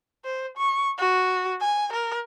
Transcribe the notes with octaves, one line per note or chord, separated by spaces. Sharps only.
C5
C#6
F#4
G#5
A#4